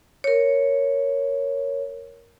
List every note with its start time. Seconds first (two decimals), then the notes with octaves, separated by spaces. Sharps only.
0.24 A#4 C#5